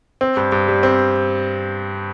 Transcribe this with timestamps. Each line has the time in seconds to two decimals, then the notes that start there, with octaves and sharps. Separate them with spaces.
0.21 C4
0.37 G2
0.52 G2
0.68 G3
0.83 C4